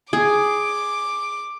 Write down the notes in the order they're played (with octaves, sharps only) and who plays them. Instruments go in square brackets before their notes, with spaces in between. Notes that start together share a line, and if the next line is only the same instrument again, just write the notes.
[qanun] G#4 [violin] D6